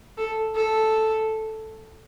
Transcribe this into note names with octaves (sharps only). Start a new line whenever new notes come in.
A4
A4